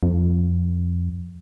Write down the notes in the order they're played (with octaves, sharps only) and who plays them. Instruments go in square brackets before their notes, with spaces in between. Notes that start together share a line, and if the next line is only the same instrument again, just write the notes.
[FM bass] F2